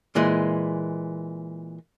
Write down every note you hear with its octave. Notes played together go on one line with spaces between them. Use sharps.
A#2 E3 G#3